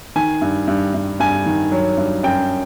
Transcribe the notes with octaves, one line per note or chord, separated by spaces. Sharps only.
D#3 G#5
G2
G2
G2
G2 G#5
D#3
F#3
G2
F#2 G5